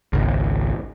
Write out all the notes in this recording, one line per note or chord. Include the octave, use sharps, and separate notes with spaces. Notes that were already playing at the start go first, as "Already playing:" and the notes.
G#1 C#2